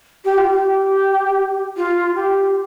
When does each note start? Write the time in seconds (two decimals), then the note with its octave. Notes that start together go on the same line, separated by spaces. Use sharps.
0.25 G4
0.38 F4
0.51 G4
1.77 F4
2.15 G4